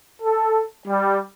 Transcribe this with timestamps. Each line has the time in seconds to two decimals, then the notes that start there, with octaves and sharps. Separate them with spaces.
0.21 A4
0.87 G3